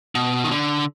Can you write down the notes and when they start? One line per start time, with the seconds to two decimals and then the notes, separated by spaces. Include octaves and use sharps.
0.15 B2
0.44 D#3
0.51 D3